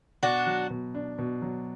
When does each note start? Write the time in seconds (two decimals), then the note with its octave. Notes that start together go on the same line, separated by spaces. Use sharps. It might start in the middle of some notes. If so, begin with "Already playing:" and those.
0.23 B2 D4 F#4
0.47 F#3
0.70 B2
0.95 D4
1.19 B2
1.42 F#3